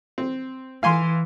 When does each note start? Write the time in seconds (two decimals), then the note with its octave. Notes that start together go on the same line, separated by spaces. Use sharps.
0.18 C4
0.83 E3 F5 G#5 C6